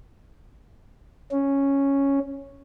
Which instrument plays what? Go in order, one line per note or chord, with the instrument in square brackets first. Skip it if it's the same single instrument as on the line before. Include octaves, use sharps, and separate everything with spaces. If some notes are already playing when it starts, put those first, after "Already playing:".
[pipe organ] C#4